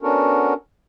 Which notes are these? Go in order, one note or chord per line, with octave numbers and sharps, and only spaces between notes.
B3 C#4 D4 F#4 A4 A#4